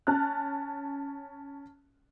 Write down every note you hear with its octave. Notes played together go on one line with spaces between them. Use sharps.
C#4 A5 F6 F#6